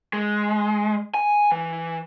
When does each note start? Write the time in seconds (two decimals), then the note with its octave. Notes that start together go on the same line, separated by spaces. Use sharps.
0.13 G#3
1.14 G#5
1.52 E3